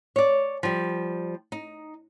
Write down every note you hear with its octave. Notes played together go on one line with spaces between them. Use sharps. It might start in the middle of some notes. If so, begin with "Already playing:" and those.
C#5 D5
F3 G3
D#4